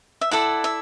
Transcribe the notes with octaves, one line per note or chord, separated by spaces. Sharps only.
E5
E4 A4 D5 F#5
E5